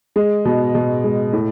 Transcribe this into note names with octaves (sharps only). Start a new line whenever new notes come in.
G#3
B2
B2
G#3
A2